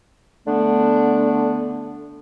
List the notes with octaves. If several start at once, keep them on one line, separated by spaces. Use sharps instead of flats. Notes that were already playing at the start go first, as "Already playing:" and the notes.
D3 A3 B3 D4